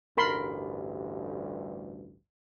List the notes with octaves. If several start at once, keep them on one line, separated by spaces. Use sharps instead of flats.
A1 D2 G2 A#4 B5 C6